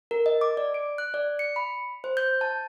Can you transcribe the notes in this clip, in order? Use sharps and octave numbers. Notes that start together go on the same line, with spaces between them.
A#4
D#5
D6
D5
D7
F#6
D5
C#7
B5
C5
G6
A5